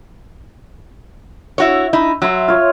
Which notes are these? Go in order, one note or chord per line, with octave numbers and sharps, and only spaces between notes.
E4 F#4 C#5
D#4 E4
F#3 E5 C6
F4 C#5